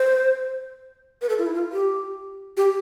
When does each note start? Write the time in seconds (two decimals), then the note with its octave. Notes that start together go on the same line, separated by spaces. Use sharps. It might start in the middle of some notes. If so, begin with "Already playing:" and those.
Already playing: C5
1.22 B4
1.29 A4
1.38 F4
1.46 E4
1.55 F4
1.73 G4
2.57 G4